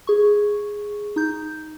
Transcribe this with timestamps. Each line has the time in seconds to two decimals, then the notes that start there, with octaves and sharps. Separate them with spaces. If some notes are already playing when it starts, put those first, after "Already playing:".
0.07 G#4 C#6
1.16 D#4 G6